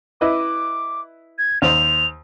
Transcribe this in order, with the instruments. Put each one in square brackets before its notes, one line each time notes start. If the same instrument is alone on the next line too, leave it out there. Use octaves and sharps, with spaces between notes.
[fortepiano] E4 B4 D#5 [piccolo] D6
[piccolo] G#6
[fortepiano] D#2 C5 [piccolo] F7